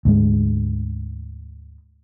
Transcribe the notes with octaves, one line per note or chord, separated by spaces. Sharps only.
D2 G#2 G#3